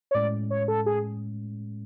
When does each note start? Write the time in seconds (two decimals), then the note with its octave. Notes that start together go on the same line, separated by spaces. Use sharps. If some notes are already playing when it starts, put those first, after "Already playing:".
0.11 C#5
0.15 A2 G#3 C#4 D5
0.50 C#5
0.68 A4
0.86 G#4